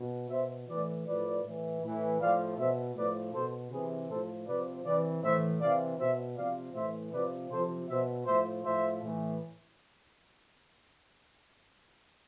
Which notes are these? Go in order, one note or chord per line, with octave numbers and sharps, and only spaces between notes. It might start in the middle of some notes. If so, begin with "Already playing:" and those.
Already playing: B2
B2 C5 E5
A2 E3 B4 D5
A2 F3 B4 D5
A2 E3
A2 E3
A2 F3 D5 F5
B2 C5 E5
A2 F3 B4 D5
B2 A4 C5
C3 E3 G#4 B4
A2 F3 A4 C5
C3 F3 B4 D5
C3 E3 B4 D5
A2 E3 C5 E5
C3 E3 D5 F5
B2 C5 E5
C3 F3 D5 F5
A2 E3 C5 E5
C3 F3 B4 D5
C3 F3 A4 C5
B2 C5 E5
A2 F3 C5 E5
A2 F3 C5 E5
A2 E3